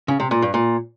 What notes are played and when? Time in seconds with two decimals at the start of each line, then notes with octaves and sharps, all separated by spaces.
0.08 C#3
0.20 C3
0.31 A#2
0.42 G2
0.54 A#2